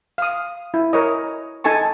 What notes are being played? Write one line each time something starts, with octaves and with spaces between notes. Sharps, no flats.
F5 D#6
E4
A#4 C#5 D#5
D#4 A4 G#5 A5 C#6